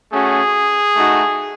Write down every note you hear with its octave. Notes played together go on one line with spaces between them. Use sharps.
A3 C#4 F#4 G#4
A3 D#4 F#4